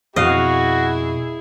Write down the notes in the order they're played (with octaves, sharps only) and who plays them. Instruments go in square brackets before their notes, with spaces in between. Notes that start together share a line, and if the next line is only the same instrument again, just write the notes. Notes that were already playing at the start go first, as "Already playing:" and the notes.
[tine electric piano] F2 B2 [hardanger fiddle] E4 G#4 [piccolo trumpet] F#4 [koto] D#5 F5